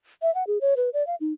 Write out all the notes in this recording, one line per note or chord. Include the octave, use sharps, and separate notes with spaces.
E5
F#5
G#4
C#5
B4
D5
F5
D#4